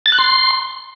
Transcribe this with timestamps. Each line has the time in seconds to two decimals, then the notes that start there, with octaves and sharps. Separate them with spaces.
0.06 A6
0.12 F#6
0.19 C6